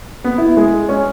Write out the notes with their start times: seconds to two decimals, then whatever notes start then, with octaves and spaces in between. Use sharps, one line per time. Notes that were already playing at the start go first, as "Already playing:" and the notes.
0.24 B3
0.38 E4
0.57 G#3
0.89 C#4